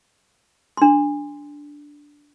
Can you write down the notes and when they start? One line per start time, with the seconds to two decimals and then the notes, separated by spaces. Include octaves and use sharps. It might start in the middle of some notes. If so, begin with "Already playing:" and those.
0.77 D4 C6